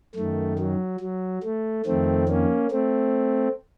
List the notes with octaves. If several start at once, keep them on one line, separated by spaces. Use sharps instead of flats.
F#2 D#3 A3
F#3
F#3
A3
F2 D#3 A3 C4
A#3 C#4
A3 C4